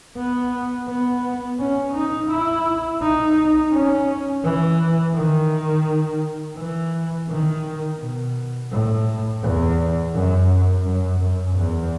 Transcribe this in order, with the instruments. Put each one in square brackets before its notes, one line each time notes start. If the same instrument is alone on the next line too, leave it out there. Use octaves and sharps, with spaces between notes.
[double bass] B3
B3
C#4
D#4
E4
D#4
C#4
E3
D#3
E3
D#3
B2
A2
E2
F#2
F#2
F#2
E2